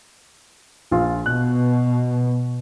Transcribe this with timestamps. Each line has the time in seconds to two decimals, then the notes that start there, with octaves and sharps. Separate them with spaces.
0.91 A#1 F4
1.26 B2 F#6